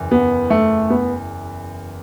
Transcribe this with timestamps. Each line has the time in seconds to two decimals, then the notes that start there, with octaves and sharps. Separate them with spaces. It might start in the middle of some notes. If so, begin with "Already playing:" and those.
Already playing: F#1 E2
0.11 B3
0.50 A3
0.90 B3